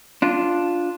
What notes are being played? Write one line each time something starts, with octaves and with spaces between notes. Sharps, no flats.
D4 F4